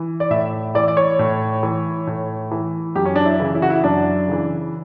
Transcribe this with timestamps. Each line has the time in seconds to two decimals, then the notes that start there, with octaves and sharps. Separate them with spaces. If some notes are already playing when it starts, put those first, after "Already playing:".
Already playing: E3
0.20 D5
0.30 A2 E5
0.75 E3 D5
0.88 D5
0.97 C#5
1.19 A2
1.63 E3
2.07 A2
2.51 E3
2.95 F#2 G4
3.05 C#4
3.16 D4
3.26 E4
3.40 C#3 E3
3.55 E4
3.62 F#4
3.70 E4
3.84 F#2 D4
4.28 C#3 E3